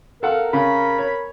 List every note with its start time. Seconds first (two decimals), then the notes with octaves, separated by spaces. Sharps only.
0.23 A4 A#4 F5 F#5
0.53 C#3 B5
0.98 C#5